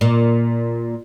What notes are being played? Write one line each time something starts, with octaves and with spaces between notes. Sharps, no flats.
A#2